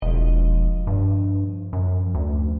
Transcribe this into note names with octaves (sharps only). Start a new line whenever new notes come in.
E1 F3 D#5
G2
F#2
D2